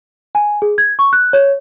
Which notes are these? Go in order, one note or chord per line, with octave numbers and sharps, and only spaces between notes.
G#5
G#4
G#6
C#6
F#6
C#5